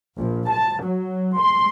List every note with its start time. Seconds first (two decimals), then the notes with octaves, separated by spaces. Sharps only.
0.19 A#1
0.49 A5
0.83 F#3
1.39 C6